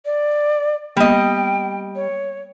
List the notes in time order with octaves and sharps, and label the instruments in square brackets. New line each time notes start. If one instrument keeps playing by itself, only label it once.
[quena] D5
[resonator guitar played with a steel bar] G3 D#5 [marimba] A#3 B3 [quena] G5
[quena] C#5